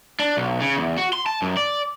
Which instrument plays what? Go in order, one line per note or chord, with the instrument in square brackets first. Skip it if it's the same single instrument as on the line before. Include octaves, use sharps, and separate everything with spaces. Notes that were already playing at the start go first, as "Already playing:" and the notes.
[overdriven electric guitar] D4
B1
C#3
E2
F#4
C6
A5
F#2
D5